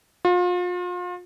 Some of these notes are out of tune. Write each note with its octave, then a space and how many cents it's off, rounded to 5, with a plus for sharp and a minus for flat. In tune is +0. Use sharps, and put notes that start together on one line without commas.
F4 +35